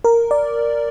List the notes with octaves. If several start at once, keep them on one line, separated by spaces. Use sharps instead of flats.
A#4
D5